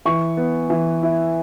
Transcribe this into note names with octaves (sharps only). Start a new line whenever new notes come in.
E3 C#6
B3
E3
E4